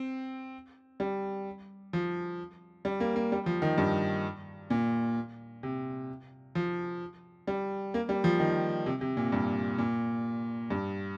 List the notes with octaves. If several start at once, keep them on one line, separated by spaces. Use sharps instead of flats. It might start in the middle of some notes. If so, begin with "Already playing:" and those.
Already playing: C4
G3
F3
G3
A#3
A#3
G3
F3
D#3
G2
A#2
C3
F3
G3
A#3
G3
F3
D#3
C3
C3
A#2
G2
A#2
G2